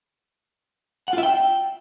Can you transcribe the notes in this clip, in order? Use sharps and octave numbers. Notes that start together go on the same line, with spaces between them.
F#5
F4
E5
G5